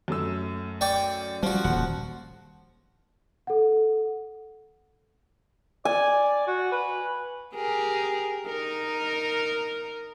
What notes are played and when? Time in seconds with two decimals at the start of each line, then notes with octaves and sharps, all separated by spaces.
0.08 F#2 A3 E6
0.81 D5 G5 C#6
1.43 F3 G3 F#4
1.64 D#1 F#5
3.47 A4 F#5
5.85 D5 G#5
6.47 F#4
6.72 B4
7.54 G4 G#4 A#4
8.47 D#4 A#4